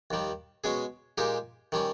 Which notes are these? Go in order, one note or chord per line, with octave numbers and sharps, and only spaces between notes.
D#2 D#3 G3
B2 G#3 C#4 G#4
A#2 G#3 D#4 G4
D#3 G3 C#4